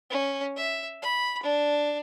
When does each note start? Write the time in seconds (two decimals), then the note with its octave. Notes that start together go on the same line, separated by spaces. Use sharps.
0.10 C#4
0.57 E5
1.02 B5
1.43 D4